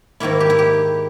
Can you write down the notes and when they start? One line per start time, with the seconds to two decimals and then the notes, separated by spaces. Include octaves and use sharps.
0.20 G#2 D#3 A#3 E4
0.40 G4
0.50 E4
0.59 G4